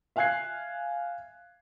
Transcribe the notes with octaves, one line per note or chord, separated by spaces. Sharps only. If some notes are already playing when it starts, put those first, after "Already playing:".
E5 F5 G#5 F#6 G#6 C7